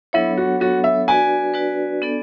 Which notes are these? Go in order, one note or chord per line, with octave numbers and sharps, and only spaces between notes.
F#3 B3 D4 E4 A4 C#5
F#4
F#3 B3 D4 F#4 A4 C#5
E5
D4 F#4 B4 D5 G#5
D4 F#4 B4 D5
B3 D4 A4 D5